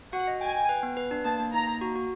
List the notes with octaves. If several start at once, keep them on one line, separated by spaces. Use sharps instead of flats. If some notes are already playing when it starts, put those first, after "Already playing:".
F#4 F#5
D#5
G5 G#5
G5
B4
B3
B4
D4
A#3 A5
A#3
D#4 A#5
A#3
F#4
F#4